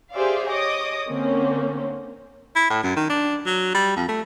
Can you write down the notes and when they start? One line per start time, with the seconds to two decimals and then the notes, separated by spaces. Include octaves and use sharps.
0.13 G4 G#4 C5 D5 E5 F5
0.48 C#5 D#5 D6 D#6
1.08 D3 A#3 C4 C#4
2.56 E4
2.70 A2
2.83 F#2
2.96 D#3
3.10 D4
3.46 F#3
3.74 G3
3.96 F2
4.08 A3